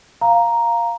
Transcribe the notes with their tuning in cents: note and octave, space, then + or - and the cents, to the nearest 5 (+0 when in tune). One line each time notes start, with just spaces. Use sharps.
F5 +0 A#5 +0